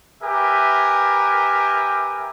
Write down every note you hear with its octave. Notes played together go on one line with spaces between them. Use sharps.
G4 A#4 B4 E5 G#5